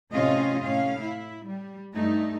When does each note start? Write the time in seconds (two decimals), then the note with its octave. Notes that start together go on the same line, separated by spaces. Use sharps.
0.11 A2 C3 C#4 F4 D#5 F5
0.62 A2 C#4 F5
1.02 E4
1.48 G3
1.95 G2 A3 D#4